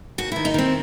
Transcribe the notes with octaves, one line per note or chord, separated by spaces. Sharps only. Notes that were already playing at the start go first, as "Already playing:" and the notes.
D#2 F#4
D#3 E4
D#4
D#3 C4